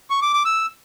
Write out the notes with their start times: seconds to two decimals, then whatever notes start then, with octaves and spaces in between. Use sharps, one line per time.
0.10 C#6
0.22 D6
0.33 D6
0.45 E6